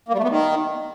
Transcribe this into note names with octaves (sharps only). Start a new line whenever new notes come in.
A#3
G3
A3
B3
D#3